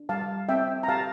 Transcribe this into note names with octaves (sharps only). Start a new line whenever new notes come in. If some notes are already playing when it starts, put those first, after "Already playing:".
Already playing: D4
G3 F5 A5
C4 E5 G5
A#5
G4 F5 A5